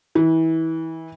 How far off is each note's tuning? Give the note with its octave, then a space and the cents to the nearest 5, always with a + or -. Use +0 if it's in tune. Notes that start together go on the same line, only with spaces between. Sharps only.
E3 -25